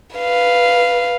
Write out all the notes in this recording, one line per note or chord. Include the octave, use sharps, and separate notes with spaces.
B4 F5